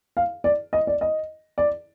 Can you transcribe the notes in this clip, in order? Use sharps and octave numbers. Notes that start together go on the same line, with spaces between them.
F5
D5
D#5
D5
D#5
D5